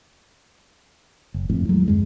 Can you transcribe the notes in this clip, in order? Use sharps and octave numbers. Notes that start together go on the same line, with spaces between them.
F#1
G#1 F2 A2
D#2 F#3 G#3
F#2 G3 G#3